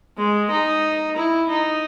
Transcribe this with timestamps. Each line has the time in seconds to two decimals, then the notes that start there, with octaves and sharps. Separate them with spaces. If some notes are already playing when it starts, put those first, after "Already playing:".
0.17 G#3
0.50 D#4
1.16 E4
1.49 D#4